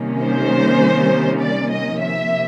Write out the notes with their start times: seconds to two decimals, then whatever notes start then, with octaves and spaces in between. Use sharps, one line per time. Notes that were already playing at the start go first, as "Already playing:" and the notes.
Already playing: C3 D#3 G3 A#3 C#4
0.23 C5
1.42 D5
1.71 D#5
2.01 C3 F3 A#3 E5